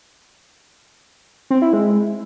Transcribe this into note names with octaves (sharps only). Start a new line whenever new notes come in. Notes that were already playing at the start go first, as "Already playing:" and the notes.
C4
E4
G#3